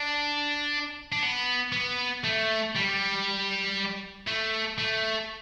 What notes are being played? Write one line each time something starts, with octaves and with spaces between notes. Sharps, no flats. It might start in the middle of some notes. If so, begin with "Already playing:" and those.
Already playing: D4
D4
B3
B3
A3
G3
A3
A3